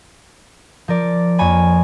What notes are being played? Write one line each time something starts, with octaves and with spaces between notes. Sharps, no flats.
F3 A#4 D5
F2 A#3 C#5 G#5 B5